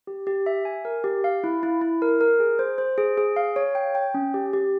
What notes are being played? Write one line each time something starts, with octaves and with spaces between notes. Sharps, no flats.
G4
G4
E5
G#5
A#4
G4
F5
E4
E4
E4
A#4
A#4
G#4
C5
C5
G#4
G#4
F5
C#5
G5
G5
C#4
G4
G4